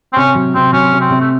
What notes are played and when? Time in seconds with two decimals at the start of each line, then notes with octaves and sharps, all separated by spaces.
0.13 C4
0.16 C3 C#4
0.35 F#3
0.55 C3 C4
0.72 F#3 C#4
0.92 C3
1.00 C4
1.10 C3
1.20 A3